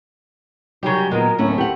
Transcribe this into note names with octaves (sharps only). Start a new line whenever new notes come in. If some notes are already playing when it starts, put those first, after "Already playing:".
C#3 F#3 G3 C#4 D#4 G4 A#4
A#2 D#3 G#3 B3 A#4
D1 A2 A3 A#3 C#4 E4
D#3 C4 G4 F#5